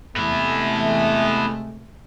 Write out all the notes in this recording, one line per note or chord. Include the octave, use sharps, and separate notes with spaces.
C3 G#3 A3 B3 E4